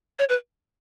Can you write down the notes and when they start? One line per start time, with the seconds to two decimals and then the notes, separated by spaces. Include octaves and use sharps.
0.19 C#5
0.29 B4